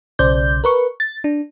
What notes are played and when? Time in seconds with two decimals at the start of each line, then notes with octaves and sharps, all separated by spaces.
0.19 B1 C#3 C5 D5 G6
0.64 A#4 B4 C#6
1.00 A6
1.24 D4